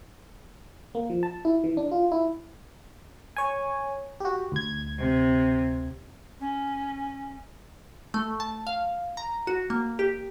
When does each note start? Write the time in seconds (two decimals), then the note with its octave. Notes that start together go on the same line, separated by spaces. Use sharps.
0.95 A#3
1.10 F3
1.23 A5
1.45 E4
1.64 E3
1.77 D4
1.92 F4
2.12 E4
3.36 C#5 G#5
4.20 F#4 G4
4.52 D2 G#6
4.99 C3
6.40 C#4
8.14 A3
8.40 A5
8.67 F5
9.17 A#5
9.47 F#4
9.70 A#3
9.99 G4